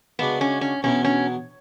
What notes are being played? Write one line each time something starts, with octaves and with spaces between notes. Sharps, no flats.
C#3 G#3 B3 D4 F#4
C#4
C#4
E2 B2 F#3 B3 C#4 E4
C#4